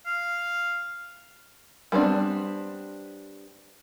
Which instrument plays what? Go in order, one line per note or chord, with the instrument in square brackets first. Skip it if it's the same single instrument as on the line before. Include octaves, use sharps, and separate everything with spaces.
[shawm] F5
[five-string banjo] G3 B3 C4 D4